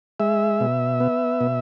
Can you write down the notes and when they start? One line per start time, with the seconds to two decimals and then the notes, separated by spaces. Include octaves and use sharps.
0.20 G#3 E5
0.60 B2
1.00 B3
1.41 B2